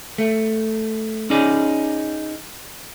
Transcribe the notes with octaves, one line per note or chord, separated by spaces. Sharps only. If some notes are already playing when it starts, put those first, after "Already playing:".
A3
C#4 D#4 G#4 D5